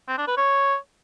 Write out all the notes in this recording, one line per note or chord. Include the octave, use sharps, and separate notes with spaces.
C4
D4
B4
C#5